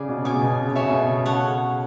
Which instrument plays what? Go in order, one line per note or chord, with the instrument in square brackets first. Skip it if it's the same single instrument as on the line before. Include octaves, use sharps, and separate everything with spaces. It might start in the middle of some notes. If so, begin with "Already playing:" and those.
Already playing: [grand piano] C#3 [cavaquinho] G#4 D5
[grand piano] B2
C#3
[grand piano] B2 [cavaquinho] C#5 G#5 D6
[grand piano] C#3
B2
C#3
B2
C#3
[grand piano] B2 [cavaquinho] A4 C#5 E5 G#5
[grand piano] C#3
B2
[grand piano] C#3 [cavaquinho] A4 C#5 F#5